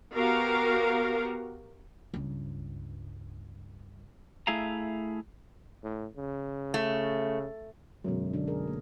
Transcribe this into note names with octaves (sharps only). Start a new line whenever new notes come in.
B3 F#4 G4 A#4 F5 A#5
C#2 G2
A3 E4 G#4 F5 A#5
A2
C#3
A3
F#2 B2 D3 G#3
D3 D4
G#4 A#4
A#3